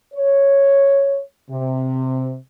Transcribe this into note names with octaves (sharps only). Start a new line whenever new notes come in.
C#5
C3